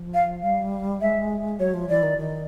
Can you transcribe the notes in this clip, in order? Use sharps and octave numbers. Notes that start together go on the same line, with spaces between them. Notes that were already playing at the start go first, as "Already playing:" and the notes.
Already playing: F3
F5
G3 F5
G#3 E5
F#3 C#5
F3
E3 D5
D#3
D#3